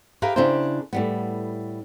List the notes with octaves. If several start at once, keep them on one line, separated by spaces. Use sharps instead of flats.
G4 G#4 A#4 B4 E5 F5
C#3 D4 E4 G4 A#4 C5
A2 G3 B3